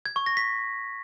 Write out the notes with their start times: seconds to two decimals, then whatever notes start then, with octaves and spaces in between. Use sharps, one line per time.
0.06 G#6
0.16 C#6
0.26 A#6
0.37 B6